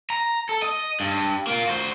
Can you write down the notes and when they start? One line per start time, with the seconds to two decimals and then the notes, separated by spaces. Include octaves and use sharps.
0.10 A#5
0.49 A4
0.62 D#5
1.00 G2
1.47 A#3 F4
1.67 F#4 C5